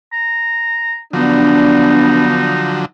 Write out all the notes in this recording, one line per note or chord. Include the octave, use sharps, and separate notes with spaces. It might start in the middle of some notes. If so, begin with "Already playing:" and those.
A#5
D3 F3 F#3 B3 D4 D#4